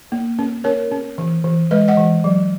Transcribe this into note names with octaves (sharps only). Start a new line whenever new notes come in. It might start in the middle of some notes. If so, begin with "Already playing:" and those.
A#3
C#4
C#4 A#4 C#5
C#4
E3
E3
G#3 B4 D#5
D#5 F#5
E3
F#3